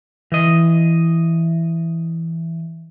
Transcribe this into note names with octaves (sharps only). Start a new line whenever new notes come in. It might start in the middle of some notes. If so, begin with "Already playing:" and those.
E3 D#5